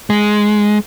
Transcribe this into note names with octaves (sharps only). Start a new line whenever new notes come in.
G#3